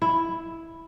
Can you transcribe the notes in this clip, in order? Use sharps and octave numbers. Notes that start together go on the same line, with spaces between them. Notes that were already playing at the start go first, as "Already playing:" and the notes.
E4